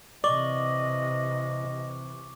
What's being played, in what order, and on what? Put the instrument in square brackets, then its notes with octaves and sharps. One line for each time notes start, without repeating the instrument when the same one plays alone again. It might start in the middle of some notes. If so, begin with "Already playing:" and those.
[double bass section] C3 E3 [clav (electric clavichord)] D5 [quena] D#5 [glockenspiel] C#6 D6 F#7